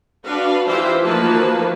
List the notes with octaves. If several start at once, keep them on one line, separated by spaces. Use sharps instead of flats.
D4 F#4 B4 F5
E3 F4 G4 C5 E5
D#3 F3 A#3 F#4 B4 A5